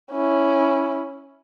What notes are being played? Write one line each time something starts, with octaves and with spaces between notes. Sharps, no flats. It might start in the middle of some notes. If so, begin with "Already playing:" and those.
C#4 E4